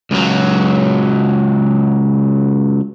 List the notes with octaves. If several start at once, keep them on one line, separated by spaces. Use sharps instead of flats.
C#2 F#3